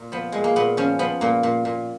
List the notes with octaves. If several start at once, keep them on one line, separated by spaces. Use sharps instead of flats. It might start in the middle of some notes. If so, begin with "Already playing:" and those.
Already playing: A#2
F3 B3
A#2 G#3
A#3
A#2 B3
F3 C#4
F3 B3
A#2 A#3
A#2
A#2